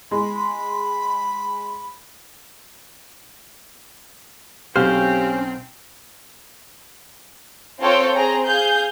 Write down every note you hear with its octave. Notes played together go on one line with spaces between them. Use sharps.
G#3 B5
B1 F#3 C4 C#4 G4 C5 F5 F6
C4 F4 A4 C5 C#5 G5
C4 G#4 A#5
G#4 F5 G6